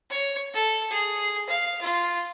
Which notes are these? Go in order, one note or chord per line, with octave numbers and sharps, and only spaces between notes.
C#5
A4
G#4
F5
F4